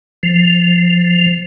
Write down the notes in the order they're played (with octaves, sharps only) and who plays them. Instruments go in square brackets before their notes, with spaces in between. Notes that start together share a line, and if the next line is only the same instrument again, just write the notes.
[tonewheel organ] F3